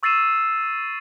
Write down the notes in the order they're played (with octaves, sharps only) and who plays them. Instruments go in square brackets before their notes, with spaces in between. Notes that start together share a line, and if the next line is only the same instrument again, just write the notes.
[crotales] C#6 E6 A6 C7 D#7 E7